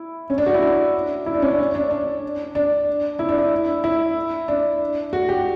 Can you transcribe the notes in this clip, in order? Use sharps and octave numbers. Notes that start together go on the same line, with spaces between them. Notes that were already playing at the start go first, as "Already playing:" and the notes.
Already playing: E4
C#4
D4
F#4
E4
D4
E4
D4
C#4
D4
C#4
D4
D4
D4
E4
D4
E4
E4
D4
F#4
G4